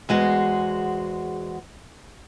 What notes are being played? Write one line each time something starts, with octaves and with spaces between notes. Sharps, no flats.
E2 G#3 F#4 C5